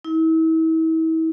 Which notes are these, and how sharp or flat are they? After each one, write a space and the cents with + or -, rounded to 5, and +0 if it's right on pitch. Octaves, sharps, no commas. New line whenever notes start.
E4 -40